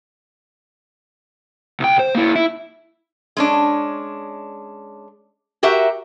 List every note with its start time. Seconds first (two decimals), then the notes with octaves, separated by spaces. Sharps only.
1.80 C2 G5
1.99 C5
2.15 A#3 E4
2.35 E4
3.37 G#3 C#4 D4
5.63 F#4 G4 A#4 E5 F#5